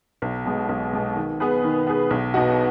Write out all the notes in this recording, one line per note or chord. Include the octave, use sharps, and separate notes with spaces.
B1
B2 G#3
B1
B2 G#3
D#3
B3 G#4 B4
D#3
B3 G#4 B4
B1
B2 B3 D#4 F#4